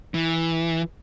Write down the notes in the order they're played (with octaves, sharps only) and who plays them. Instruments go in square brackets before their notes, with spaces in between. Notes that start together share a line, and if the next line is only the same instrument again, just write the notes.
[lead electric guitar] E3